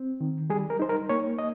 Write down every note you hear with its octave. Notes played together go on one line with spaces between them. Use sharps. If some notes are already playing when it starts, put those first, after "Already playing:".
Already playing: C4
D#3
G3 G#4
A#4
D#4 C5
A#4
A#3 C#5
D#5